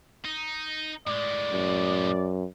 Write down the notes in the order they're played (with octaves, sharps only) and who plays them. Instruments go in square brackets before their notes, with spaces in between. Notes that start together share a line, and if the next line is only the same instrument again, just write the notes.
[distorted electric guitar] D#4
[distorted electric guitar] A2 G#3 [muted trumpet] D5
[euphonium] F#2